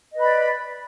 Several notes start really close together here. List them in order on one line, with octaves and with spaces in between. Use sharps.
D#5 B4 B5 D5